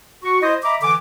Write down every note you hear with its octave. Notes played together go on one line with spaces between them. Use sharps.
F#4 C#6
E4 C5 D#5
D#5 E5 A#5 B5 D6
D3 E3 G#5 D6